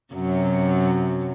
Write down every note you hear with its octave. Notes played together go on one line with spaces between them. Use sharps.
F#2 C3 F#3